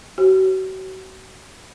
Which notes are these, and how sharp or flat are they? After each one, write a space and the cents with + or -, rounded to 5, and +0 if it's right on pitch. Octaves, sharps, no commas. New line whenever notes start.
F#4 +40 C5 +35